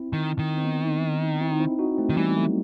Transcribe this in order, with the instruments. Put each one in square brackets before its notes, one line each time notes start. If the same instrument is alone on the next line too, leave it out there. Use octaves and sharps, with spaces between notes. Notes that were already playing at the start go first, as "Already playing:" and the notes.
Already playing: [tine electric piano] C4 E4
[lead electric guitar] D#3
D#3
[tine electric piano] C4
B3 D#4
C4 E4
D#4
C4 E4
D#4 F#4
A3 C4
[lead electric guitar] D#3
[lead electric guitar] E3 [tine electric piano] G3 B3
[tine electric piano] F#3 A3